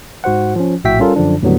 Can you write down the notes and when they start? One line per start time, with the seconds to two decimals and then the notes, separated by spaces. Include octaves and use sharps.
0.24 G#2 F#4 C5 F#5
0.56 F3 C#4
0.84 A#1 A2 F#4 E5 G5 B6
1.00 G3 C#4 F4 A4 A#4
1.16 F#2 D3 F3 D4
1.42 D#2 A2 D3 F#3 G3 B3